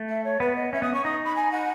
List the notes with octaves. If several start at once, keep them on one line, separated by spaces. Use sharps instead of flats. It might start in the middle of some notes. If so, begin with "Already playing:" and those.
Already playing: A3
E5
C#5
B3 B4
D#5
C#4 E5
B3 D#6
C#4 C#6
D#4 D#6
B5
G#5
F#5